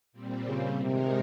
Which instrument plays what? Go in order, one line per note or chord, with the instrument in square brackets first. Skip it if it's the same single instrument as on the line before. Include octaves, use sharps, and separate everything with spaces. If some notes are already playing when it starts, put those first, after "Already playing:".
[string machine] A#2 G3 C4
[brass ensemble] C#3
[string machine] G#2 D#3 G#3 D#4 A#4 [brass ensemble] C3